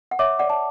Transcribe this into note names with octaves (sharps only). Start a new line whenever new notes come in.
F#5
C#5 E5 D6
D5 F#5
A5